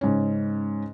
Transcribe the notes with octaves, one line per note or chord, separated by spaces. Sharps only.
G#2 C#3 C#4